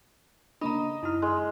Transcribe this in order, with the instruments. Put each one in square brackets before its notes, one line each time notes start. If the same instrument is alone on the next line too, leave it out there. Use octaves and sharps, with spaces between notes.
[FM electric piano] C#3 A#3 D4 [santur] D#5 [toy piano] A#5 B5
[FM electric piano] F#2 F6 [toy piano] D#4 E4 F#4
[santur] G#3